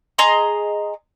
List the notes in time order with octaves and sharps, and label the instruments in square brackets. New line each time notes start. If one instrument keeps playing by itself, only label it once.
[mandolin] G#4 D#5 A#5 C6